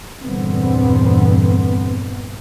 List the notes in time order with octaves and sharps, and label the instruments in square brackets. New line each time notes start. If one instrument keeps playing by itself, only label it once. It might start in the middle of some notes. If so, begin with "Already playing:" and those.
[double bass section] E2 G2 A#2 D3 B3 C4